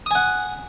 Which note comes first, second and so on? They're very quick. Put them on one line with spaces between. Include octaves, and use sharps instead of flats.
D#6 G#5 F#5